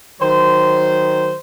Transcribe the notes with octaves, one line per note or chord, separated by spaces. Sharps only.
D#3 F#3 C5